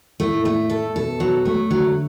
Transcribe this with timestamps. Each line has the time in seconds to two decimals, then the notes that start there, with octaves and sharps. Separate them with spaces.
0.20 A2 A3
0.45 A3
0.70 A4
0.96 B2 A4
1.20 F#3
1.45 A3
1.70 D3 F#3